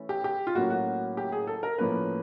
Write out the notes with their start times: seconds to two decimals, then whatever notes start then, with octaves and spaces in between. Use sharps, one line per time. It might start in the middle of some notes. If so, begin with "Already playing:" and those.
Already playing: E3 A3 C#4
0.09 G4
0.24 G4
0.47 F4
0.55 A2 F#3 A#3 C#4 F#4
0.70 F#4
1.17 G4
1.32 G#4
1.47 A4
1.63 A#4
1.78 A2 F3 A#3 C#4 B4